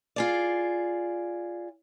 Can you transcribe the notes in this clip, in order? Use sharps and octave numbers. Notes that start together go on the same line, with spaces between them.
F4 G#4 D5